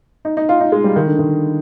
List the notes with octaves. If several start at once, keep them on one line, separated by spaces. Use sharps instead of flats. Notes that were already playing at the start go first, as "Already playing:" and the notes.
D#4
D#4
F4
D#4
G#3
G3
D#3
D3
D#3